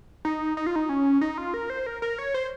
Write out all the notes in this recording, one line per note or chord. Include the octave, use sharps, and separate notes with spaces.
D#4
D#4
F4
D#4
C#4
D#4
F4
A#4
C5
A#4
A#4
C#5
C5